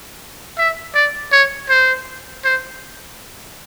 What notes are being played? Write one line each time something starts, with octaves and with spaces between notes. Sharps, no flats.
E5
D5
C#5
C5
C5